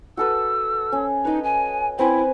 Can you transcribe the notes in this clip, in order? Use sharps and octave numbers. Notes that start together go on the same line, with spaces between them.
F#4 A4 B4 E6
C#4 C6
D#4 B4 D#5
G#5
C4 E4 B4 G#5